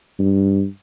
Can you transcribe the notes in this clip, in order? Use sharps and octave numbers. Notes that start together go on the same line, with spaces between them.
G2